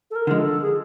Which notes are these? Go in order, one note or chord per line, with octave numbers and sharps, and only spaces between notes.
A4
A#4
D3 F3 G#3
A4
G#4